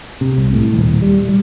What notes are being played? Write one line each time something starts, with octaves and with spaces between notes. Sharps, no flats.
C3
C2
A2
D#1
G3
G3